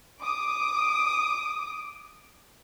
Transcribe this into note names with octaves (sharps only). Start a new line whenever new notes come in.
D6 D#6